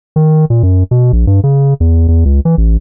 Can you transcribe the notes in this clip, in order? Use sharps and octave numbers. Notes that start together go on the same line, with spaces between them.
D#3
A#2
F#2
B2
A#1
G2
C#3
E2
E2
C#2
E3
A1